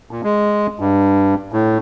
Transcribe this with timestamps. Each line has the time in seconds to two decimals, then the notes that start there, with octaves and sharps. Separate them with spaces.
0.11 A#2
0.23 G#3
0.80 G2
1.52 A2